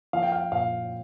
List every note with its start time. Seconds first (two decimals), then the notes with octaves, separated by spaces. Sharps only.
0.13 F3 F5
0.23 G5
0.32 F5
0.52 A#2 F5